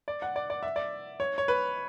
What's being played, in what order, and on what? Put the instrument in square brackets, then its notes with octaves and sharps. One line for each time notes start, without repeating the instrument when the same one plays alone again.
[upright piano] D5
F#5
D5
D5
E5
D5
C#5
C#5
B4